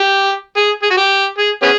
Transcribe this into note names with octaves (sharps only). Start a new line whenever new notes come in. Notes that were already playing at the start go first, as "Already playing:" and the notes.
Already playing: G4
G#4
G#4
F#4
G4
G#4
B3 C#4 G#4